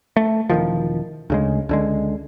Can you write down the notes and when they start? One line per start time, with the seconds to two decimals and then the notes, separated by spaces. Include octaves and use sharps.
0.16 A3
0.50 E1 D#2 D#3 F3
1.30 D2 C#3 G#3
1.69 C#2 D3 G#3